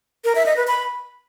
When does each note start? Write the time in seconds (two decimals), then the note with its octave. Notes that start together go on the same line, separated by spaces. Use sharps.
0.25 A#4
0.35 E5
0.46 D#5
0.57 B4
0.67 B5